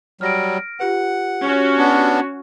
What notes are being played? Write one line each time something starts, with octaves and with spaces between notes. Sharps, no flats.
F#3 G3 F6 A#6 D7
F4 G4 B4 F#5
C#4 F#4
B3 D4